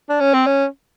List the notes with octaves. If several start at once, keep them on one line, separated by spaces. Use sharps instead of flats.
D4
C#4
C4
C#4